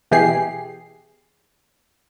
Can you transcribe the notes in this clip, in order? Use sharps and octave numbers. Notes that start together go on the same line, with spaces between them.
B2 E3 G4 G#4 C7